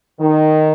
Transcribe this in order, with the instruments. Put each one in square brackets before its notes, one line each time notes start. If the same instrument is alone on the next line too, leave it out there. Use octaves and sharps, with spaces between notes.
[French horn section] D#3